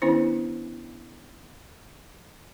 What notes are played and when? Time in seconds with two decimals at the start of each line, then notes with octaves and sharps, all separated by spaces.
0.02 D#3 B3 C#4 D4 E4 C5